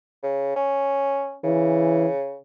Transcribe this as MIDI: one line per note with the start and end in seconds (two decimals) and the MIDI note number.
0.23 0.52 49
0.56 1.36 61
1.44 2.37 49
1.44 2.06 52